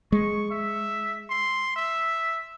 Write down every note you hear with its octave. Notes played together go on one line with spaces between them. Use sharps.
G#3 C#6
E5
C6
E5